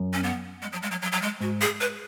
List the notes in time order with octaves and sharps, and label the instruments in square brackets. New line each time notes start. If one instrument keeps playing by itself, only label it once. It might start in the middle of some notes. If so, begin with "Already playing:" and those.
Already playing: [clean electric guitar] F#2
[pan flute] C#4
B3
G#3
F#3
G#3
F#3
F#3
F#3
G#3
[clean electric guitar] G#2 [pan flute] F#4
[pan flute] G#4
B4